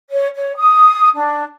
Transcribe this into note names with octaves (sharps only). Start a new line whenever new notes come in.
C#5
C#5
D#6
D4